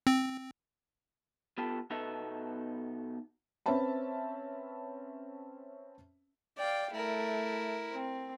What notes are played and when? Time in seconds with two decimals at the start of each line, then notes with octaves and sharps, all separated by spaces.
0.07 C4
1.58 B3 F4 G4 A4
1.90 B2 B3 D#4 A4 E5
3.66 C4 C#4 B4 E5 A5 B5
6.58 D5 F5 G5
6.93 A3 E4 A#4
7.93 C4